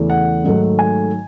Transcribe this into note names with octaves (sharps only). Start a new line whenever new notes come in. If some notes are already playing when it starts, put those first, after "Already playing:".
Already playing: E2 C#3 E3 A3
F#5
G#2 D#3 F#3 A3
G#5